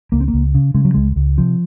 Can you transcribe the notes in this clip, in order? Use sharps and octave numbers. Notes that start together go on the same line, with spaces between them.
C#2 A#3
C4
A#3
C#2
C#3
C#3 G#3
F#3
C#2 G#3
C#2
C3 F3